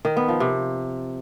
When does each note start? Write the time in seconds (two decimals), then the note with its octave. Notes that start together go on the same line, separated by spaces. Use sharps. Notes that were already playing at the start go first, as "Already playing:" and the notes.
0.05 D#3
0.17 B3
0.28 F3
0.40 C3